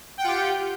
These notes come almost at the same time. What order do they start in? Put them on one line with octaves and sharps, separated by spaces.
G5 F#5 F4 G4